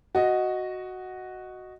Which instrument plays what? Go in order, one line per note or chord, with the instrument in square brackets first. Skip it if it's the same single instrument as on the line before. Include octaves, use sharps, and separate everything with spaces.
[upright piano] F#4 D#5